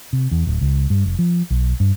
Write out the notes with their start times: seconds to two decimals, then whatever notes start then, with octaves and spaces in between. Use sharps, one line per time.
0.13 C3
0.31 E2
0.47 D1
0.61 C#2
0.90 G2
1.05 F1
1.19 F3
1.50 B1
1.80 G2